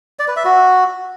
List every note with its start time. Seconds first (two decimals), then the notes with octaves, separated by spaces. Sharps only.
0.19 D5
0.28 B4
0.36 E5
0.45 F#4